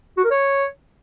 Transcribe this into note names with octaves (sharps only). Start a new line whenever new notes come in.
F#4
A#4
C#5